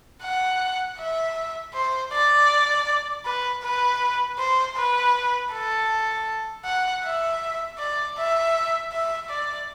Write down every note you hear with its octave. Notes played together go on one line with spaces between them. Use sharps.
F#5
E5
C5
D5
B4
B4
C5
B4
A4
F#5
E5
D5
E5
E5
D5